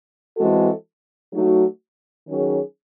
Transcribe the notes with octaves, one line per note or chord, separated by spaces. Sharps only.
E3 G#3 C4 F#4 A4
F#3 A3 D#4 F#4
D#3 F#3 C#4 G#4